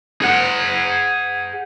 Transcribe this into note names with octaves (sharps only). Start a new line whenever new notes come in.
G#4 F#5